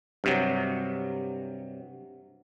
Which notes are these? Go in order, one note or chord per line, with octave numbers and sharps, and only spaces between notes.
G2 C3 F#3